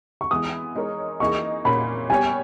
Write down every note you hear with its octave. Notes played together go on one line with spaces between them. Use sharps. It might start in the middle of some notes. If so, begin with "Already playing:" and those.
C#6
E3 G#3 B3 D#6
G#3 D#4 A#4 C#5
E3 A#3 D#4 G#4 C#6
A#2 A#3 C#4 B5
G3 B3 G4 C#5 G#5